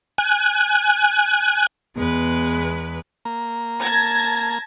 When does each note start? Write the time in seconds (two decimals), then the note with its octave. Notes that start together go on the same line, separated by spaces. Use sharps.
0.18 G#5 F#6
1.96 E2 G#3 B3 B4
3.25 A#3
3.81 A5 G#6 A#6